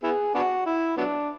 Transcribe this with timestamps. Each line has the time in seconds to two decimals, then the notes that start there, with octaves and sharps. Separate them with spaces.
0.03 B3 E4 G#4
0.35 B3 D4 F#4
0.66 E4
0.97 F#3 B3 D4